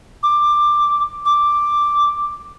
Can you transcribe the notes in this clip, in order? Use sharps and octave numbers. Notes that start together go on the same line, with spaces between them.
D6
D6